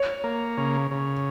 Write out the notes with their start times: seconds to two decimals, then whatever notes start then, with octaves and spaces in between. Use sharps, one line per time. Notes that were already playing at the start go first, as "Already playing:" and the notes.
Already playing: C#5
0.24 A#3
0.57 C#3
0.91 C#3